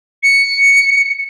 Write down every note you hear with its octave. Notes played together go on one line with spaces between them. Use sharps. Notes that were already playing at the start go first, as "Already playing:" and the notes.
C#7